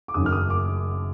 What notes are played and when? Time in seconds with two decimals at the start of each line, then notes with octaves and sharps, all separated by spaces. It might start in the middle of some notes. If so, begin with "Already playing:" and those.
0.08 D6
0.14 F#1 F#2 D#3 D#6
0.26 F6
0.32 D#6
0.50 D6